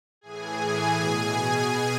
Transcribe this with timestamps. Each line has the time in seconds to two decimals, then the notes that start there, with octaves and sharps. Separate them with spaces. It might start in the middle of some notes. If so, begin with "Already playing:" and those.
0.21 A2 E3 G#4 G#5
0.95 B2